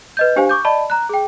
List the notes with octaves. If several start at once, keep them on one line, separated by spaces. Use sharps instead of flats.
B4 D#5 G6
D4 G4 C5 F5 G#5
C#6 D6 G6
D5 D#5 A5 B5
A#5 F#6
G#4 G5